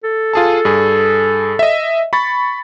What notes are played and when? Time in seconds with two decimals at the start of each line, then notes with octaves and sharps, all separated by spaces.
0.04 A4
0.33 F4 G#4 A5
0.65 G2 G#4
1.59 D#5 E5
2.13 B5 C#6 A6